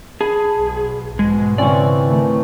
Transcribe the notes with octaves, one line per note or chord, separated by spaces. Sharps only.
G#4 A5 B5
B1
G#2 B2 G#3
C#3 E3 C4 C#4 D5
D#3 A3